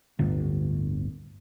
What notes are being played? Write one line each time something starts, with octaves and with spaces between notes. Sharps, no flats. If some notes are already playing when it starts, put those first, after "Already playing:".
D1 G1